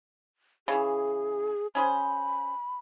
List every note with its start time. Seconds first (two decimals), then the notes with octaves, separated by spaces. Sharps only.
0.68 C#3 E3 G#4
1.75 C#4 G#4 C5 B5